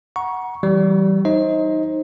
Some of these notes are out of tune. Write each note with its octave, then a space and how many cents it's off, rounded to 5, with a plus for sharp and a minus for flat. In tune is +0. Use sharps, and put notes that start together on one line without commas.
F#5 +0 A#5 +35 C#6 +0
E3 +5 G3 -25
D#4 +0 C5 +25 D#5 +30